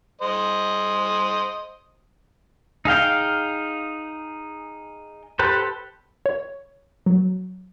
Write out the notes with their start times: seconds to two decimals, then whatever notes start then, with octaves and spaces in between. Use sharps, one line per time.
0.22 C5 D#5
2.85 D#4 G#4 F5 G5
5.39 G4 A4 B4 C5
6.26 C#5
7.06 F#3